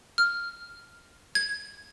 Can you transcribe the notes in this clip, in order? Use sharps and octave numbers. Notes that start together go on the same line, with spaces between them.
F6
G#6